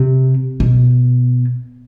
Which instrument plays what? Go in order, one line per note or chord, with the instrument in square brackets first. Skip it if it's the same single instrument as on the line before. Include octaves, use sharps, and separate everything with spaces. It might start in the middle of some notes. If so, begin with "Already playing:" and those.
Already playing: [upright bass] C3
B2